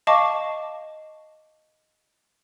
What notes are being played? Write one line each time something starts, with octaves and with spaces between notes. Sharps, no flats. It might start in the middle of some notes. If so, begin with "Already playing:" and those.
D#5 F5 A5 C#6 D6